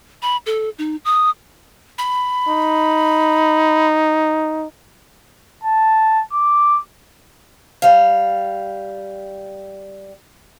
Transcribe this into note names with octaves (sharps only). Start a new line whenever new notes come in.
B5
A4
D#4
D#6
B5
D#4
A5
D6
G3 F5